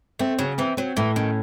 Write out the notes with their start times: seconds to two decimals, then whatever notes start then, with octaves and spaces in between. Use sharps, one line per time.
0.19 A3 C4
0.39 C#3 F#3
0.58 E3 C4
0.77 F#3 C4
0.97 A2 E3
1.16 D#3 C#4